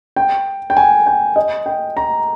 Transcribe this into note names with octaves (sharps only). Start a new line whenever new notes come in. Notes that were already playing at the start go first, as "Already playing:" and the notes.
G5
G5
G#5
G5
D#5
G5
A#5